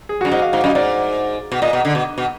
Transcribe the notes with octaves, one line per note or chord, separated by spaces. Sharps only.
G#4
F#4
F#2
G#2 D#5
F5
G#2 F5
F#2 D#5
G#2 D5
B2
A#2 D#5
B2
D3
B2
B2